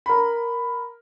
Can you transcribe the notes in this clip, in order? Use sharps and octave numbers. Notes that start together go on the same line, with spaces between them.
A#4 B5